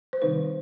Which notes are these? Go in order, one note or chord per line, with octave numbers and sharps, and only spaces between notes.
C5
C3 D#3 G3 C4 D#4 B4